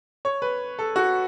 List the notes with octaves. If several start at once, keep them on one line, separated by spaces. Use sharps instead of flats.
C#5
B4
A4
F#4